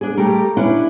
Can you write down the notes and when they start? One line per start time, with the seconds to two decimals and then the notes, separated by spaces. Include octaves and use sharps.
0.01 D4 G#4
0.17 G3 A3 G4 A#4
0.57 C#4 D4 E4 B4